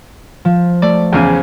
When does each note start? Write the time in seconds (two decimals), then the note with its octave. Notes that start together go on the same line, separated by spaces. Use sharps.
0.45 F3
0.82 A3 D5
1.13 E2 C#3 C5 G#5